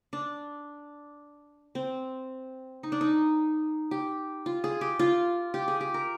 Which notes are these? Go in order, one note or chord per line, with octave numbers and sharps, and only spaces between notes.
D4
C4
D#4
D4
D#4
G4
F4
G#4
G4
F4
G4
G#4
G4
A#4